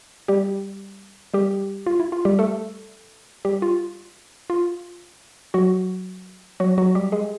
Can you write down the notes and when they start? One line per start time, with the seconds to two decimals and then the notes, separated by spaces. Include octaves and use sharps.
0.28 G3 G4
1.34 G3 G4
1.86 F4
2.00 E4
2.12 F4
2.25 G3 G4
2.39 A3 A4
3.45 G3 G4
3.62 F4
4.50 F4
5.54 F#3 F#4
6.60 F#3 F#4
6.78 F#3 F#4
6.95 G3 G4
7.12 G#3 G#4